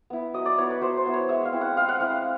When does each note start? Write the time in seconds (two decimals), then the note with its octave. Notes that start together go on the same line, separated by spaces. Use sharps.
0.10 B3 E4
0.34 F#3 D#5
0.46 D5
0.58 B3 E4 C#5
0.70 B4
0.81 F#3 C5
0.97 C5
1.06 B3 E4
1.14 C#5
1.29 G#3 E5
1.45 F5
1.52 C4 E4
1.61 F#5
1.77 G#3 F5
1.89 F#5
2.00 C4 E4 F5